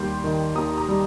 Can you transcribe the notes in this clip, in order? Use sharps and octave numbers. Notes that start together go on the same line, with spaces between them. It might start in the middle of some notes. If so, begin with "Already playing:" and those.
Already playing: D#2 G3 G5 C6
D#3
D#2 A#5 D#6
A#5 D#6
G3